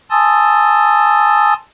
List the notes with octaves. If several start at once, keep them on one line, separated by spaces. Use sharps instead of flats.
G#5 A5 C6 D#6 E6 A6